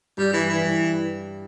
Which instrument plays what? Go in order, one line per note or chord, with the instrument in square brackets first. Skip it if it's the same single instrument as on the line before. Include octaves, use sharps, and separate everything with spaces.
[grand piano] G2 [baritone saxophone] G3
[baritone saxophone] E3
E3
[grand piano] G2